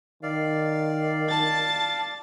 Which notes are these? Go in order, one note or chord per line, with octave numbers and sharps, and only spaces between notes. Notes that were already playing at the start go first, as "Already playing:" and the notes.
D#3 D5 F5
A5 A6